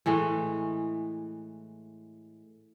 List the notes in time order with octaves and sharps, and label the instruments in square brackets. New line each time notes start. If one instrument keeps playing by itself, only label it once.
[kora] A2 E3 G#3 A3